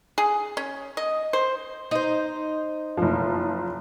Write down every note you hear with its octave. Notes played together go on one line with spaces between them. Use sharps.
G#4
C#4
D#5
C5
D#4 C5
F#1 F3